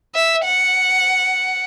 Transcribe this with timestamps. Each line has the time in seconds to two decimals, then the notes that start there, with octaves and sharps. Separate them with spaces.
0.15 E5
0.44 F#5